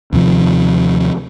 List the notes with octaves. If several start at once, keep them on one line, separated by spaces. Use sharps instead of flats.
D#2 C3 F3